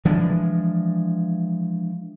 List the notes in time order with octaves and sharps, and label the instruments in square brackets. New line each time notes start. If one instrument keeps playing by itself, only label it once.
[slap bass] E3 F3 G#3 D4